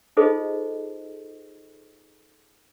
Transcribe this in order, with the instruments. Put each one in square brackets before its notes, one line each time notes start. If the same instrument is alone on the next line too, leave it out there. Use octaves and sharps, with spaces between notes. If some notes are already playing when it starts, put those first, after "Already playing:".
[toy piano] D#4 F4 G#4 A4 C5 D#5